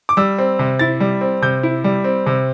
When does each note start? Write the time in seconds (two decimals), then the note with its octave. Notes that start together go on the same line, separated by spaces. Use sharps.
0.09 D6
0.17 G3 E6
0.39 C4
0.59 C3
0.79 E4 A6
1.00 G3
1.21 C4
1.42 C3 G6
1.63 E4
1.84 G3
2.04 C4
2.26 C3